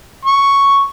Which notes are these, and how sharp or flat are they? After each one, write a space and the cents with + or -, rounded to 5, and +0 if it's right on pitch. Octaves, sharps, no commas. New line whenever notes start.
C#6 +0